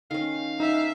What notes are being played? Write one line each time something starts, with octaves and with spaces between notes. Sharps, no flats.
D#3 C#4 F5
D#4 E5